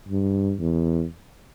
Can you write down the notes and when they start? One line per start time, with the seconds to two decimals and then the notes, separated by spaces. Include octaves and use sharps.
0.08 G2
0.60 E2